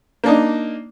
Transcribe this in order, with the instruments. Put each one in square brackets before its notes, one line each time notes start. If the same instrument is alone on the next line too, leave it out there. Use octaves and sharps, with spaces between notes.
[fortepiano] A#3 D4 D#4